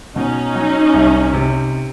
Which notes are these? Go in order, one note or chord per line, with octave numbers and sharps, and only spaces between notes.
B2 C#4 D#4
F#3
C2
C3